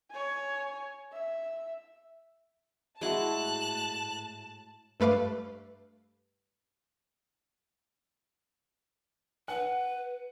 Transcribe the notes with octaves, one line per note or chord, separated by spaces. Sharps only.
C#5 G#5
E5
A2 G#3 E4 F#4 A5 F#6
G2 A3 B4 F5 D6
B4 F#5